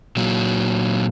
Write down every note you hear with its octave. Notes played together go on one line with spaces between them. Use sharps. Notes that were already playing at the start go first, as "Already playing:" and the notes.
A#2 F#3